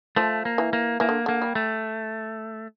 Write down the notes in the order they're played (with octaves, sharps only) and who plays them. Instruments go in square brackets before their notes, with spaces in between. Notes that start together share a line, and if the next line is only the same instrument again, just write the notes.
[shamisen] F3 [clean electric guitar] A3
[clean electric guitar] A#3
[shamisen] E3
[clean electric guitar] A#3
[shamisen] E3 [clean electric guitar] A#3
[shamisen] D3
[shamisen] D3 [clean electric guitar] A#3
[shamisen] G3
[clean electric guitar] A3